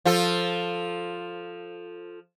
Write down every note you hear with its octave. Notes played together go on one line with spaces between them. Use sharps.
F3 F4 A4